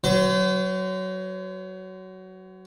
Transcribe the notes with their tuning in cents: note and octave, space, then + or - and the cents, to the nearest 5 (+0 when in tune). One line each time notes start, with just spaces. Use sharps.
F#3 +15 C5 -40